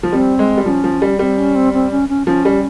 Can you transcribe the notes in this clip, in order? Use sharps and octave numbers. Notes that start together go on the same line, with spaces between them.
F3
G3 C4
G#3
G3
F3 C#4
F3
G3
G3 C4
C#4
C4
C4
C#4
C#4
F3 C#4
G3